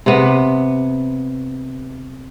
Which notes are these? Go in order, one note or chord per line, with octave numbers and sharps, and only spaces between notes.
C3 B3